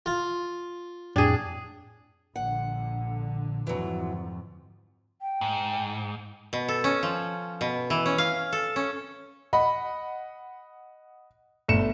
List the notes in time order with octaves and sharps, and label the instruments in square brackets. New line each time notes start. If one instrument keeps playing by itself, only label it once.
[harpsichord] F4
[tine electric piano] F2 A2 G5 [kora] D4 G#4
[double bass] A#1 [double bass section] D3 [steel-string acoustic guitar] F#5
[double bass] F2 G#2 [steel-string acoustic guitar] E3 F#3
[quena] G5
[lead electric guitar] G#2
[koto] B2
A4
C#4
F3
B2
E3
C#4
F5
A4
C#4
[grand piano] D#5 F#5 B5
G1 A3 C#7 E7